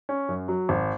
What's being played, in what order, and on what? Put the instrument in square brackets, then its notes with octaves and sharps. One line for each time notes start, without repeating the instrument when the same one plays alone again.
[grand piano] C#4
F#2
F#3
G#1